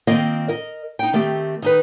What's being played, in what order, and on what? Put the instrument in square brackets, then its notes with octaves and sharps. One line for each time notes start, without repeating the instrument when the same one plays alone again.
[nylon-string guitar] D#3 A#3 C4 F4 D#5
A#4 D#5
D#4 G5
D#3 A3 C4 G4
D#3 D#4 B4